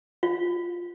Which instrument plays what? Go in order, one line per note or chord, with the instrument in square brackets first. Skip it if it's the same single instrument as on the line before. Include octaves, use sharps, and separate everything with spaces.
[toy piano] F4